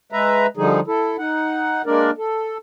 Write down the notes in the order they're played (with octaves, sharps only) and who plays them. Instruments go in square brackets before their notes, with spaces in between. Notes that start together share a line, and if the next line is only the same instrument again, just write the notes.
[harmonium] G#3 B4 E5 A#5
D3 F3 G3 D#4 G#4
E4 A4
D#4 F#5
G#3 A#3 D4 A#4 D5
A4